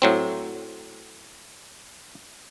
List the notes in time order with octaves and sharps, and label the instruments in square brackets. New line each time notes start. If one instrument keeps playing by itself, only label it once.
[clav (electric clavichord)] A2 F#3 C4